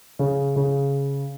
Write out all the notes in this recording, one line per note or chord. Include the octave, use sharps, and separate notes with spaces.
C#3
C#3